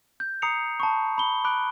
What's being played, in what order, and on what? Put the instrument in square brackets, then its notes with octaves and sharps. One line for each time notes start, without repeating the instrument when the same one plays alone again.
[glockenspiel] G6
A#5 D#6 C7 C#7 F7
A5 B5 C#6
B5 G7
B5 D6 F#6 D7